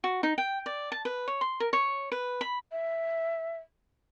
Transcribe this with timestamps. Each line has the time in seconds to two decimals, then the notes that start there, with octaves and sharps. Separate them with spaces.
0.04 F#4
0.23 D#4
0.38 G5
0.66 D5
0.92 A5
1.05 B4
1.28 C#5
1.41 C6
1.60 A#4
1.73 C#5
2.12 B4
2.41 B5
2.72 E5